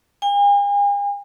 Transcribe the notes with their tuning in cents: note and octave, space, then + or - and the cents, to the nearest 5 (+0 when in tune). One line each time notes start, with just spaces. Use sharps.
G#5 -45